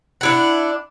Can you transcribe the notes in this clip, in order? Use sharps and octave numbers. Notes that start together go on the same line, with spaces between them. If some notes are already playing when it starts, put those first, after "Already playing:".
D4 E4 F#5